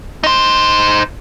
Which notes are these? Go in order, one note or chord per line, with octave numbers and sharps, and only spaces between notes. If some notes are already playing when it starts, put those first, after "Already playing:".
D#4 C5